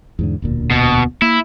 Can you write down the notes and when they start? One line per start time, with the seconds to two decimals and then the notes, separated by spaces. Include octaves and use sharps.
0.19 E2 G#2 D3
0.42 E1 D2 A#2
0.71 B2
1.22 A#3 E4